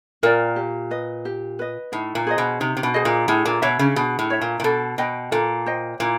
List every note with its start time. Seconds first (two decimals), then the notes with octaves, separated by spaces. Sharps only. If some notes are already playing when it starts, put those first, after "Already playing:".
0.23 A#2 A#4 D5 G5
0.56 G4
0.91 B4 D#5
1.25 G4
1.59 B4 D#5
1.92 A2 D#4
2.15 A#2
2.27 G#4 C5 D#5
2.38 B2
2.60 C3 D#4
2.77 C3
2.83 B2
2.94 G#4 C5 D#5
3.05 A#2
3.28 A2 G#4
3.45 A#2
3.62 B2 C#5 E5
3.79 C#3
3.96 B2 G#4
4.19 A2
4.30 C#5 E5
4.41 A#2
4.60 A#2
4.64 B2 A4
4.98 B2 C5 D#5 G5
5.31 A#2 A4
5.66 C5 D#5 G5
6.00 A#2 E4